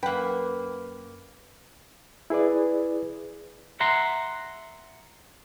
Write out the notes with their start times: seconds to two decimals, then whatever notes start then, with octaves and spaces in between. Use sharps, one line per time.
0.03 F#2 A#3 B4 F#5 G5
2.30 E4 G#4 B4 D5
3.80 E5 F#5 A#5 C6